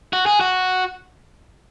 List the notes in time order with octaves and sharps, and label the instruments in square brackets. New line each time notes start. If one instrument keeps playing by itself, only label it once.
[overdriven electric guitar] F#4
G#4
F#4